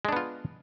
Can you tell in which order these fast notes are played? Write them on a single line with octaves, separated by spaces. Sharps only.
G#3 D4 B3 F4